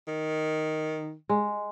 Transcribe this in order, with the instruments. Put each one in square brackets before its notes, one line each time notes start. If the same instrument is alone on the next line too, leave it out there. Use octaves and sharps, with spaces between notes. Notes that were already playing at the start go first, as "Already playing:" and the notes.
[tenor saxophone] D#3
[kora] G#3